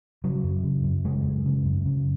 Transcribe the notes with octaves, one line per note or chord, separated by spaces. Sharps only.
C#3 F#3
F#2
C#3
F#2
C#3 G#3
F#2
C#3
F#2
C#3